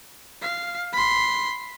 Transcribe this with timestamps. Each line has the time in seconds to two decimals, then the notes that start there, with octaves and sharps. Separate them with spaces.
0.42 F5
0.93 B5 C6